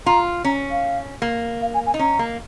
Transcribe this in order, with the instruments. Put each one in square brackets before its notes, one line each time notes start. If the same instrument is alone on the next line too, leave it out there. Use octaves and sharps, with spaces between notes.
[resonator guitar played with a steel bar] F4 [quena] A#5
[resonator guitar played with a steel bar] C#4 [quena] A#5
[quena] F5
[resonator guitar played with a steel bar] A#3
[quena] F5
G#5
G#5
[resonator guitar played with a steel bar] D#4
[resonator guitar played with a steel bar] C#4 [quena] A#5
[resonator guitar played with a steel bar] A#3